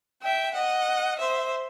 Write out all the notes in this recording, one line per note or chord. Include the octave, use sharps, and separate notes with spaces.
E5 G5
D#5 F#5
C5 E5